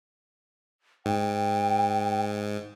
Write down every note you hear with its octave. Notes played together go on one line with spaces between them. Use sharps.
G#2 G5